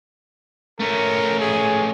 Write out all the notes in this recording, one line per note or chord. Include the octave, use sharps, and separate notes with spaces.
A3 C#4 A#4
G#4